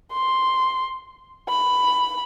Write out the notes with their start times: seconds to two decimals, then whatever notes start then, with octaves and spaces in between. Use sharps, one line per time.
0.13 C6
1.49 B5